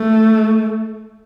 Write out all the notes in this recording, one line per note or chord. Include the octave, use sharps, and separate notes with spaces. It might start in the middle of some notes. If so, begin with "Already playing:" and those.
Already playing: A3